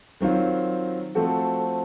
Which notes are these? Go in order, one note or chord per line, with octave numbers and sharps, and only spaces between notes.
D#3 F#3 C4 F4
F3 A3 C4 F#4 A4